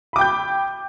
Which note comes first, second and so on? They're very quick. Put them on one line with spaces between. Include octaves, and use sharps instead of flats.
B5 D6 G5 G6